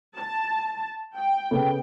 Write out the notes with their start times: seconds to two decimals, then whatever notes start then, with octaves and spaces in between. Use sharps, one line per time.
0.15 A5
1.15 G5
1.51 C#3 B3 A4